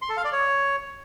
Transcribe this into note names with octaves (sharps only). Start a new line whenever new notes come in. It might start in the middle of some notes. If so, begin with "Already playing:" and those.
C6
A4
F5
D5
C#5